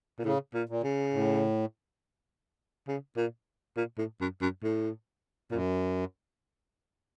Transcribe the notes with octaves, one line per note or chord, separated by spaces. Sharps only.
A#2
A2 C#3
A#2
A#2
C#3
A2
C#3
A#2
A#2
A2
F#2
F#2
A2
F#2 A#2